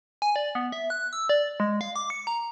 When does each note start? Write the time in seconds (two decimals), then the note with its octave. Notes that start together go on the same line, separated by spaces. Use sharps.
0.22 G#5
0.36 D5
0.55 B3
0.72 E5
0.90 F#6
1.13 E6
1.29 D5
1.60 G#3
1.81 F5
1.96 D6
2.10 C#7
2.27 A#5